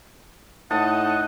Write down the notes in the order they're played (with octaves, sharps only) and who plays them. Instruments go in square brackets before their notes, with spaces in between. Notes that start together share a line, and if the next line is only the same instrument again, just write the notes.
[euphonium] A2 [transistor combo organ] D#4 [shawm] F#5 [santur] A5 D#6